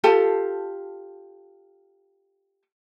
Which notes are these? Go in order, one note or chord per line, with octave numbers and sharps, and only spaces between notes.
F4 G4 A4 A5